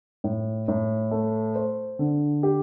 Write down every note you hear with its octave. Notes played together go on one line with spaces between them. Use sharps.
A2
A2
A3
C5
D3
G4